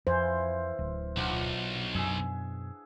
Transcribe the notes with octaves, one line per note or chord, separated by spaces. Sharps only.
F2 E3 C5 F5
D1
B1 D4 F4 F#5
F#2 B2 G#4 E5